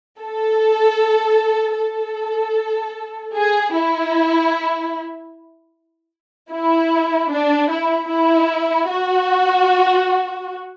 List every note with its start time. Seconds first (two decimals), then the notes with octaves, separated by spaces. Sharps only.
0.20 A4
1.78 A4
3.36 G#4
3.75 E4
6.52 E4
7.31 D4
7.71 E4
8.10 E4
8.89 F#4